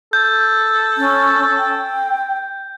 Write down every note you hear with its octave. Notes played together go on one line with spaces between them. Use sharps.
A4 G6
C#4
G5